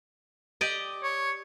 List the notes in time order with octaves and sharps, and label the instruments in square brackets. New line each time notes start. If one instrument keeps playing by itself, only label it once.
[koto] G4 D5 D#5
[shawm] C#5